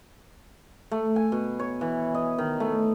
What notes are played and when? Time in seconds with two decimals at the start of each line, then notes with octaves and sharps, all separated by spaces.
0.92 A3
1.16 G#5
1.32 B2
1.59 C#5
1.81 E3
2.15 D#5
2.38 D#3
2.60 A3